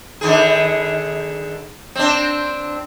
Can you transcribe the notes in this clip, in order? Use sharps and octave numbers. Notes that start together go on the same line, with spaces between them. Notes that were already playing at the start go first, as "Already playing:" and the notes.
D3 D#3 G#4
C4 D4